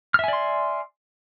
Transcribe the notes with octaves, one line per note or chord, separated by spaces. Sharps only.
D5 E5 G#5 C6 F6